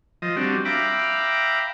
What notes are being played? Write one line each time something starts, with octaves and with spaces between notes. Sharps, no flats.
F3 D#5
G3 C4 D4 F#4
E5 F5 G5 A#5 B5 D6